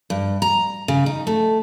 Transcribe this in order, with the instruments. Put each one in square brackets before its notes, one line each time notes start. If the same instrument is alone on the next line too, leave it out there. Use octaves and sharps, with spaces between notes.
[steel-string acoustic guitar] G2
A#5
C#3
D#4
A3